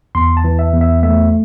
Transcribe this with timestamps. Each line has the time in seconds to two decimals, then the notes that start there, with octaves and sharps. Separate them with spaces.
0.15 E2 C6
0.37 A5
0.44 E3
0.59 E5
0.74 E2
0.81 E5
1.03 A3 E5